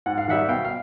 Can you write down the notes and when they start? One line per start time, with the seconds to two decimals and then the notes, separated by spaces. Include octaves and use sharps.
0.06 G#2 F#5
0.18 F5
0.28 D#3 G3 E5 F#5
0.48 B2 F5 G5
0.65 F5